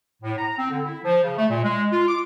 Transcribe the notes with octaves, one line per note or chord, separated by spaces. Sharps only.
A2
A#5
C4
D3
E4
F3
C#3
A3
A#2
G#3
F4
D6